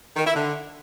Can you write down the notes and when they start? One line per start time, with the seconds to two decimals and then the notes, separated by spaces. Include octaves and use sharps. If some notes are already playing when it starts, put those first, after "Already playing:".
0.16 D#3
0.25 E4
0.34 D3